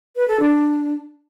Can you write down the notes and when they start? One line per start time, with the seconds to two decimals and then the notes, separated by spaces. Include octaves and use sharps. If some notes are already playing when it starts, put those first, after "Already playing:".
0.16 B4
0.28 A4
0.40 D4